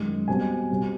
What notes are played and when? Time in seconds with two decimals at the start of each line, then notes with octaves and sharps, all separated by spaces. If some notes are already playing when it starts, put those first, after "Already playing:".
Already playing: F#2 D#3 G#3
0.28 B2 G3 C4 G#5
0.70 B2 G3 C4